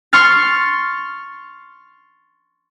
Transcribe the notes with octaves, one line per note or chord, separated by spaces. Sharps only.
C6 C#6 F6 A6